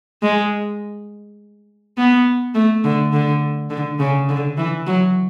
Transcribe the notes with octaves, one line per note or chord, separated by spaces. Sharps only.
G#3
B3
A3
D3
D3
D3
C#3
D3
E3
F#3